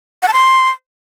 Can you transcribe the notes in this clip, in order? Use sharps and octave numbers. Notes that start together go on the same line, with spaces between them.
F#5
A5
C6